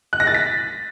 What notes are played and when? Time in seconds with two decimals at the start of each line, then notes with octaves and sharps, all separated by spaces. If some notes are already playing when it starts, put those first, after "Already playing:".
0.13 F#6
0.20 A#6
0.27 A6
0.34 B6